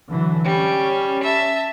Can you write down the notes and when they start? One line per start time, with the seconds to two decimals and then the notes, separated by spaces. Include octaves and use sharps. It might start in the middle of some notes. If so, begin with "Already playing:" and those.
0.11 D3 E3 F#3
0.45 G3 C#4
1.23 E5 A5